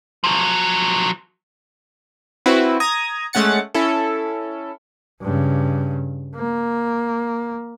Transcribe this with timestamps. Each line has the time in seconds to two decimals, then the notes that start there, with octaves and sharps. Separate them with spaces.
0.24 F3 F#3
2.46 C4 E4 F#4 B4
2.80 A#5 D#6 G#6
3.33 G#3 A3 C#4 F#5 A6 C#7
3.74 C#4 E4 A4
5.21 G2 C#3
6.35 A#3